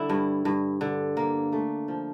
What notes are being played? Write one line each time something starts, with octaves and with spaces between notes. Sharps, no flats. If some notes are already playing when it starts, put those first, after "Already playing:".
Already playing: D3 G3 E4
G2
G2
D3
A#3
A3
F3